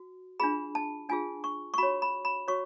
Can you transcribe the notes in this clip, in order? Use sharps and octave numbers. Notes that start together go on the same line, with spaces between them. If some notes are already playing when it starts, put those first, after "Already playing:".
Already playing: F#4
D4 F4 G#4 B5
A5
D4 F4 G#4 G#5
C#6
C#6
F#4 C#5 B5
B5
B5
F#4 C#5 C#6